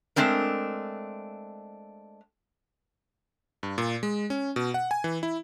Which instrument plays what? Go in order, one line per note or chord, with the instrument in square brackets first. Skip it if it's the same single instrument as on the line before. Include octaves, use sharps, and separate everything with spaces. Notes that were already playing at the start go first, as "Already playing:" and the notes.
[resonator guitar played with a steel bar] G#3 A3 C4 D4 A#4
[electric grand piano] G2
A#2
G#3
C#4
B2
F#5
G#5
E3
E4